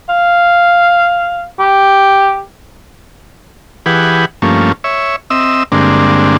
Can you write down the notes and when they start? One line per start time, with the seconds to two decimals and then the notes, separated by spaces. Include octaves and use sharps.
0.09 F5
1.59 G4
3.86 E3 G4 G#4 B4 F#5
4.42 G2 F3 A3 A#3 C#4
4.84 C#5 E5
5.30 C4 D#5 E5 E6
5.72 G2 D3 G#3 A#3 C4 D4